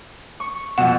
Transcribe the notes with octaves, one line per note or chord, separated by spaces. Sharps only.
C#6
F2 B2 F#5